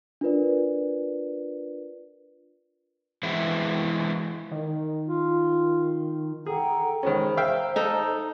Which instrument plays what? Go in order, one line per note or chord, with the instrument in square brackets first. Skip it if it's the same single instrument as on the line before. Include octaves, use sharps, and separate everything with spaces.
[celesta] D4 F4 A#4 B4 D5
[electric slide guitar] E3 G#3 B3 C4 E4
[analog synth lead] D#3
[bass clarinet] F4
[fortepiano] G#4 [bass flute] A4 [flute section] F#5 G5 A#5
[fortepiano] D#3 G#3 C#4 [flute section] G#4 C#5 B5 [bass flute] C5
[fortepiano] E5 F5 G5
[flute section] A#5
[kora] D#4 A4